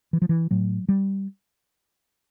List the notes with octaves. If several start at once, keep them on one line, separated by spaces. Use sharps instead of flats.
E3
F3
E3
A2 F#3
G3